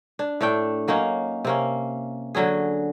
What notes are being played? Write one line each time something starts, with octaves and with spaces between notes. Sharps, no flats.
D4
A2 A3 D4 G5
F#3 A#3 C#4 D#4
C3 A#3 C#4
D3 F#3 C#4 G#4